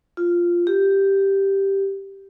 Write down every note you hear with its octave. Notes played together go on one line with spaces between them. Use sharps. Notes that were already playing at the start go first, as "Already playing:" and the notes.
F4
G4